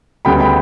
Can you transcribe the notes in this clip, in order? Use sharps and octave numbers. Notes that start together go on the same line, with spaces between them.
D2 C#3 G3 B3 G5 B5
G5 B5